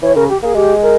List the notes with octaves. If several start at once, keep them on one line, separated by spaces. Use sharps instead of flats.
E3 C#5
C#3 A#4
G4
A#3 G#4
G#3 G4
A#4